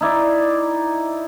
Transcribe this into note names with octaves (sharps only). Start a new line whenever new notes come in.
D#4 E4 D5